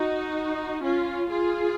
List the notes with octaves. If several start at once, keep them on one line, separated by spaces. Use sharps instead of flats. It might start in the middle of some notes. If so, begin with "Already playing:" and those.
Already playing: D#4 F#4
C#4 F4
F4 G#4